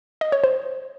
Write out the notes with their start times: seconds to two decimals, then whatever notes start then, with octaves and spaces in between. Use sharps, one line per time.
0.21 D#5
0.32 C#5
0.44 C5